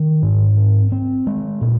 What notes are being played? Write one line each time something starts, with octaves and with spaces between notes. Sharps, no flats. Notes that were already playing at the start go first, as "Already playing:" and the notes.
Already playing: D#3
G#2
C4
C4
G#3
A#2